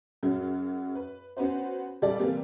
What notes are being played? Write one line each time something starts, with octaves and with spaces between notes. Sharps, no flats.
F#2 C#3 F#3
B4
B3 C#4 F#4 B4 C5
C#2 G3 A4 D5
C3 E3 G3 A#3 C4